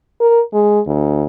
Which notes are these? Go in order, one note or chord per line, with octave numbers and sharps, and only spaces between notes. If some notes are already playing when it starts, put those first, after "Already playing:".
A#4
G#3
D2